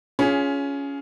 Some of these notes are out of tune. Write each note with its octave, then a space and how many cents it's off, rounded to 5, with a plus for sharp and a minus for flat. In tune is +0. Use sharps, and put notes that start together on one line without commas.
C#4 +15 F4 +0 G#4 +0